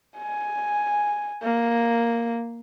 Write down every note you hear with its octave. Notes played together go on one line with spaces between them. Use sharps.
G#5
A#3